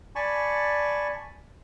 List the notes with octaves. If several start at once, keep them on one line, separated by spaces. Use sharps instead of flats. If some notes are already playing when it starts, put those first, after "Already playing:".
D5 G#5 A5 B5 C#6